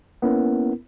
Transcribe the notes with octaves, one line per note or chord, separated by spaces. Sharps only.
A#3 B3 C#4 E4 A#4